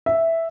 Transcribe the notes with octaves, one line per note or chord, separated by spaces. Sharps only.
E5